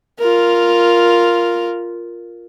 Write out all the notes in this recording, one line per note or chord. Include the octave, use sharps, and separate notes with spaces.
F4 A#4